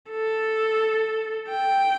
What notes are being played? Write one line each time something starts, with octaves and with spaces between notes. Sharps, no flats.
A4
G5